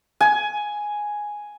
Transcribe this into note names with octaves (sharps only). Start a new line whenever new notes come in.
G#5